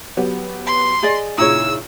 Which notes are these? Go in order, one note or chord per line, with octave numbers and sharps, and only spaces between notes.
F#3 B3 G4
C6
G#4 D5 D#5
A#2 C#3 D#4 E4 C#5 E6